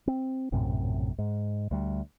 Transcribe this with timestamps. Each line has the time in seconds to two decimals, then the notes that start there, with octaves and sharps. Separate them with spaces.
0.07 C4
0.52 A#1 F#2 A2 C3
1.18 G#2
1.71 D2 G3